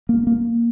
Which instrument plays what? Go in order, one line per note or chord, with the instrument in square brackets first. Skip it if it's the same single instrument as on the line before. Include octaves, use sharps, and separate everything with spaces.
[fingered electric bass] A#3
A#3